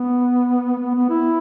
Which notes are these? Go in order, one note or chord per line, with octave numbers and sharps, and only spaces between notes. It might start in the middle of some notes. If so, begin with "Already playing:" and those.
Already playing: B3
B3
B3
E4